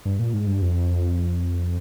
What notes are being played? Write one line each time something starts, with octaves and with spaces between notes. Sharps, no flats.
G2
A#2
G#2
G2
F2